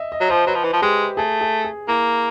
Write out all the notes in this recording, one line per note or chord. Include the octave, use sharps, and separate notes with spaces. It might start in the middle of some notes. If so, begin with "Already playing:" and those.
Already playing: D#5 E5
D#5
F#3
F3 C5
F#3 B4
F3
E3
F3
G#3 G4
A3 G#4
G#4
G#4
A#3 E4